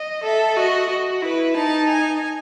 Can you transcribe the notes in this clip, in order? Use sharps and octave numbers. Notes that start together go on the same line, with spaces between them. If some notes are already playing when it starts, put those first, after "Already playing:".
Already playing: D#5
A4 E5
F#4 D#5
F#4
E4 B4
D#4 A5
G#5